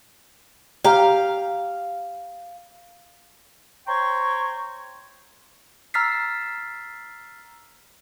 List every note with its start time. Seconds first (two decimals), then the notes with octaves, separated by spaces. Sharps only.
0.84 G4 F5 A#5
3.87 C5 C#5 G5 A#5 C6 C#6
5.94 A#5 E6 F6 A6 B6 C7